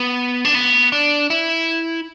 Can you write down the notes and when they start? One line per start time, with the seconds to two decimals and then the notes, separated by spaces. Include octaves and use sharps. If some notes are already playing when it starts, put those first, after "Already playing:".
Already playing: B3
0.45 D4
0.55 B3
0.92 D4
1.30 E4